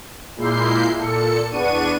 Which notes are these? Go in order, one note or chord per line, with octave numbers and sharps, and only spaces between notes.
A#2 G#3 A#3 E4 G6 C7
A#2 A4 C#7
E2 B3 D4 C#6 D#7